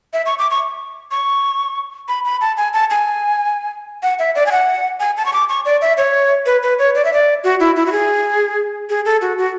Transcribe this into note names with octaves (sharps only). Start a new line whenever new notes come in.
E5
C#6
D6
C#6
C#6
B5
B5
A5
G#5
A5
G#5
F#5
E5
D5
G#5
F#5
G#5
A5
C#6
D6
C#6
D5
E5
C#5
B4
B4
C#5
D5
E5
D5
F#4
E4
E4
F#4
G#4
G#4
A4
F#4
F#4